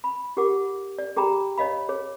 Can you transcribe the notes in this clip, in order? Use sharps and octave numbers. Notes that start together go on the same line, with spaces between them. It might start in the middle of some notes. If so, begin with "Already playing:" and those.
B5
F4 G4 G#4 A#4 F#5 D6
D5
G4 G#4 G5 A#5 B5
C#5 D#5 F5 B5
G#4 C#5